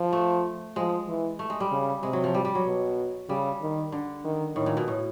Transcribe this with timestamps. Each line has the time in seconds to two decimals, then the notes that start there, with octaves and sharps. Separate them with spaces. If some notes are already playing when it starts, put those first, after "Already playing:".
Already playing: F3
0.13 A3
0.76 F3 G#3
1.08 E3
1.39 A3
1.50 G#3
1.60 G3
1.71 C#3
2.03 C3 G#3
2.13 F#3
2.24 F3
2.34 G3
2.45 G3
2.55 F#3
2.65 B2
3.29 C#3 G3
3.61 D#3
3.92 D3
4.24 D#3
4.56 A2 D#3
4.66 A#2
4.77 B2
4.88 A2